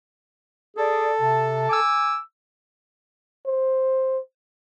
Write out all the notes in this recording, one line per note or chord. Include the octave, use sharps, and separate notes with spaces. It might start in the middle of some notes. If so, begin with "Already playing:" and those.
G#4 A4 D5
C3 A5
G#5 D6 E6
C5